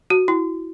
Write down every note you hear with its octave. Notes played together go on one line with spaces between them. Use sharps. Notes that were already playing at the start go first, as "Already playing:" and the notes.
F#4
E4